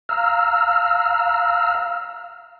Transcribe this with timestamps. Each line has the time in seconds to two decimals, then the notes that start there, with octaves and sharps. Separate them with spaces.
0.09 F5 A#5 E6 F6